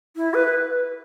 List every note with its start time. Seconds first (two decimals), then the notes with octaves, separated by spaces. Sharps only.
0.16 E4
0.34 B4